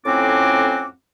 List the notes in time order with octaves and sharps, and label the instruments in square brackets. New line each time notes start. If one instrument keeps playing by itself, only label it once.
[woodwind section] F2 A2 C4 C#4 F#4 D6